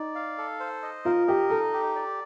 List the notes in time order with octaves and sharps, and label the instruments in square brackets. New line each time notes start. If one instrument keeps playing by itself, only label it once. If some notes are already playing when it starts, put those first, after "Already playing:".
Already playing: [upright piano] D#4 [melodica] D5
[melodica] F5
A4
C5
D#5
[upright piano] F4 [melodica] A#4
[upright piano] G4 [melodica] D#5
[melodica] D#4 [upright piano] A4
[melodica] G4
D5